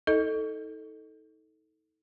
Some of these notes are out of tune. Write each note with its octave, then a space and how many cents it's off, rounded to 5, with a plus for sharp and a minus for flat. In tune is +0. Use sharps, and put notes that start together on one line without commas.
D#4 +35 A4 +0 D#5 +0